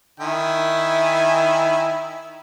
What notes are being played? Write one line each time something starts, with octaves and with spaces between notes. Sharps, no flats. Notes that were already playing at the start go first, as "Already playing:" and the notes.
D#3 E4 G#5